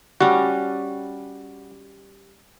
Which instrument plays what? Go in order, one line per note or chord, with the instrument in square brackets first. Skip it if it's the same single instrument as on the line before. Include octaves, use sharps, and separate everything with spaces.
[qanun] G3 C#4 [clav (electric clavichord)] F#4